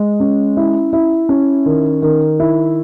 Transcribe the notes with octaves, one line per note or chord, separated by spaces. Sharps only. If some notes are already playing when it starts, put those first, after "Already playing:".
Already playing: G#3
C#4
E4
E4
C#4
D#3
D#3
E4